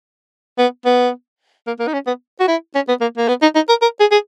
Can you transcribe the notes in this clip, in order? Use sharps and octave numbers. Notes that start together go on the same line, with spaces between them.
B3
B3
A#3
A#3
D#4
C#4
B3
F#4
E4
C#4
B3
A#3
A#3
B3
D#4
D#4
A#4
A#4
G#4
G#4